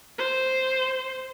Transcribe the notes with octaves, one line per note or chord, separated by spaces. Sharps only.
C5